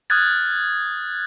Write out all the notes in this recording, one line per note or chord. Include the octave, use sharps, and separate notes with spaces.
D#6 F6 F#6 G#6 A6